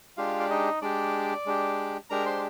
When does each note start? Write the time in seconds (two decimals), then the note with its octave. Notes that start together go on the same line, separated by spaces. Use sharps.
0.17 G#3 D4 F4 G4 F5
0.40 D5
0.50 D#4 D#5
0.82 G#3 D4 G4 D5
1.46 G#3 D4 G4
2.10 G#3 D4 G4 A#4 A#5
2.26 C5 C6